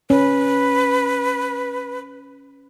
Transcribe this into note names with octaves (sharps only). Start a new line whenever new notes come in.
C#4 B4